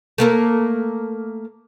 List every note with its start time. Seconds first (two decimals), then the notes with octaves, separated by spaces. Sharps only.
0.18 A3 A#3 A#4